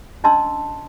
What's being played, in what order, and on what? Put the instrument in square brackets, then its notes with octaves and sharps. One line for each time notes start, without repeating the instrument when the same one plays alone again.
[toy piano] C#4 D4 D#5 A5 C6 E6